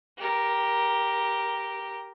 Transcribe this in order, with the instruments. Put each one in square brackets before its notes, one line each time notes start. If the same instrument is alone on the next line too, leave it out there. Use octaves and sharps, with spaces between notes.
[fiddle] G4 A#4